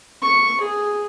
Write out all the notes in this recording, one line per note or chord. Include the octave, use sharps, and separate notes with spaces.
C#6
G#4